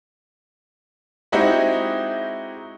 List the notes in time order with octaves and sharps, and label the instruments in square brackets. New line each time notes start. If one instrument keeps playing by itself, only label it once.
[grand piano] G#3 C4 D#4 E4 F#4 G4